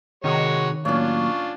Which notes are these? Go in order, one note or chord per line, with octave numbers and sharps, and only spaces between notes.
C3 D#3 G#3 D#4 F#4 C#5
A2 F#3 A#3 C#4 D4 F4 C#5